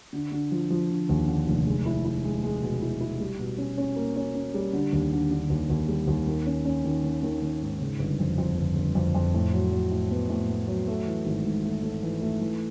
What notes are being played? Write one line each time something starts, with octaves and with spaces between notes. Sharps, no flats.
D3
D3
F3
F3
D3
D#2
D3
F1
G#3
E4
E4
G#3
G#3
B2
E4
E4
G3
B2
C#4
C#4
A#3
C#4
C#4
G3
D3
D#2
D3
D3
D#2
D#2
G3
D#2
D#3
C#4
C#4
D#3
D#3
D#3
D#3
G#2
C#3
G1
F2
F2
G1
G1
F2
F2
A2
F#3
F#3
A2
B3
A2
B3
F#3
A3
E3
G#1
G#2
A3
A3
E3
A3
E3